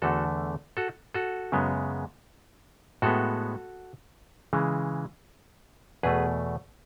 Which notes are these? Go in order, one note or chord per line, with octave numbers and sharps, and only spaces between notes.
E2 D3 A3 F#4 A4
F#4 A4
F#4 A4
F#2 C#3 G#3 B3
A2 G#3 B3 F#4 A4
C#3 E3 G#3
E2 B2 A3 G#4 B4